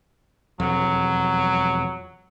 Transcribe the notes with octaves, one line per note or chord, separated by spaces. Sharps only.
E1 F2 F#3